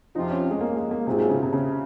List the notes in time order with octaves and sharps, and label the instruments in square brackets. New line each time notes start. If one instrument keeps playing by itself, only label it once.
[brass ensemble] F2 C3 F3 C4 F4 [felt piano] D#4
[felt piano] C#4
G#3
A#3
G#3
A#3
[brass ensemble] G#2 F#3 C4 F4 G#4 [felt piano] C3
[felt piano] C#3
C3
C#3